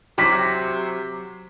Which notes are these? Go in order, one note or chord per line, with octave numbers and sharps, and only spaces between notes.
C3 F#3 D6 B6